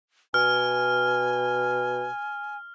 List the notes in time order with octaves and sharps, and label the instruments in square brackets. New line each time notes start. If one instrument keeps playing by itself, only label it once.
[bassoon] B2 [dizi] G#5 [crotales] F6